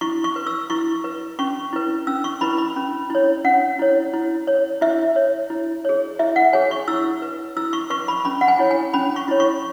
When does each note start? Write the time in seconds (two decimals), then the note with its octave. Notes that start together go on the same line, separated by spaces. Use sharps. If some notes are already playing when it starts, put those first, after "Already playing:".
0.01 E4 C#6
0.24 C#6
0.36 B4
0.47 E6
0.70 E4 C#6
1.04 B4
1.39 C#4 C#6
1.73 E4 B4
2.07 C#4 E6
2.24 C#6
2.41 E4 B4 B5
2.58 B5
2.76 C#4
3.10 E4 C#5
3.44 C#4 F#5
3.79 E4 C#5
4.13 E4
4.47 C#5
4.81 E4 E5
5.16 C#5
5.50 E4
5.85 G#4 C#5
6.19 E4 E5
6.36 F#5
6.53 G#4 C#5 G#5
6.71 C#6
6.88 E4 E6
7.22 B4
7.57 E4 E6
7.73 C#6
7.90 B4 C#6
8.08 B5
8.25 C#4 B5
8.41 F#5
8.48 G#5
8.59 E4 C#5
8.71 G#5
8.94 C#4 B5
9.16 C#6
9.28 E4 C#5
9.40 C#6